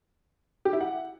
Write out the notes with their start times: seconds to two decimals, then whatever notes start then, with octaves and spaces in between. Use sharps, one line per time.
0.65 G4
0.73 E4
0.81 F#5